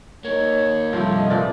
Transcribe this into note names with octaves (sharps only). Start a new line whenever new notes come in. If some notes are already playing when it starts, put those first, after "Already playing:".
A#3 D#4 C#5
G2 C3 F3 A3
D#5
A#2 E3 D5